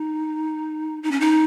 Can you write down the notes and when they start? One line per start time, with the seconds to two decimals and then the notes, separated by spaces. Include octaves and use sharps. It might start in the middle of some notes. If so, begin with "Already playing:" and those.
Already playing: D#4
1.03 D#4
1.11 C#4
1.20 D#4